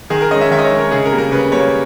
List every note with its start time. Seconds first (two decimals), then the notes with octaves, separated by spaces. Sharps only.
0.10 D#3 G#4
0.21 A#4
0.31 G#3 C#4 D#5
0.41 E5
0.51 D#3 E5
0.59 D#5
0.64 C#5
0.71 G#3 C#4
0.78 A#4
0.91 C#3 G#4
1.05 A#4
1.12 G3 A#3
1.18 A#4
1.32 C#3 B4
1.52 G3 A#3 C#5